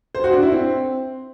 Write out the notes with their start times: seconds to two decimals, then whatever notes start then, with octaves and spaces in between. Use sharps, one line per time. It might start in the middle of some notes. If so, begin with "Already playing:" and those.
0.15 C5
0.24 F#4
0.33 D4
0.42 E4
0.52 C4